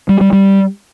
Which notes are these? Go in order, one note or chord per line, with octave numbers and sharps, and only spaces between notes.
G3
G3
G3